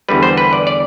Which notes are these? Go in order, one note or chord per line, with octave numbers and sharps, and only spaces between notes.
E2 D3 G3 B4
C5
B4
D5
D5